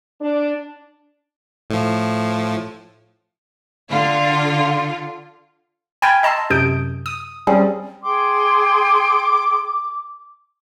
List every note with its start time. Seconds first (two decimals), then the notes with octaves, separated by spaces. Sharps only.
0.21 D4
1.70 A2 F3
3.91 D3 F4
6.02 G5 G#5 B5 F6 G6 G#6
6.23 D#5 A5 A#5 C6 E6
6.50 F#2 C3 D#6 G6 D7
7.06 D#6
7.47 G3 C4 C#4 G#4
8.04 G#4 G5 C6 D6